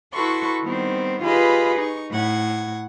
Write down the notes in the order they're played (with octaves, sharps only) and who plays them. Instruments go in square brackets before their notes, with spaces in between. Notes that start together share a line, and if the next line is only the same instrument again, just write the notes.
[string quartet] E4 F#4 A4 B4 C6 C#6
D#3 G3 B3 C4
F4 G4 G#4 B4 D#5 B5
D#4 C#6
A2 F#5 G#6